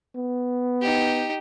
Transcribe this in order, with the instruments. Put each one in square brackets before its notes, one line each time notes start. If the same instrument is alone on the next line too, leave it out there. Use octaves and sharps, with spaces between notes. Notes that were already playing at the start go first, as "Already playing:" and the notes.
[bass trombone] B3
[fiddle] D#4 G4